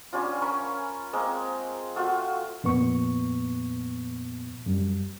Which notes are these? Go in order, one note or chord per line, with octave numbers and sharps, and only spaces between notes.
G3 C#4 D4 F4
C#4 A#4 B5 C#6
G#3 A#3 C4
A3 F4 F#4 E5
F2 A#2 B3 C#6
F#2 G3